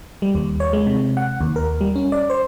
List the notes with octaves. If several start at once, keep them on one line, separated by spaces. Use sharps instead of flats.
G3
D#2
C#5
G#3
C3
F#5
D#2
A#4
G3
C#4
D5
C5